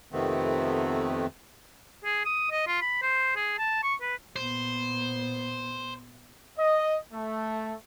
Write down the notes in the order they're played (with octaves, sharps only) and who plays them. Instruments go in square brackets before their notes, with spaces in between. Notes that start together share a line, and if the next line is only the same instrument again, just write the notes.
[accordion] F2 C3 D#3 A3 B3 C4
[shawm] G#4
D#6
D#5
F4
B5
C5
G#4
A5
C#6
B4
[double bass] A#2 B3 [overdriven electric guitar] C5
[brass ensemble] D#5
A3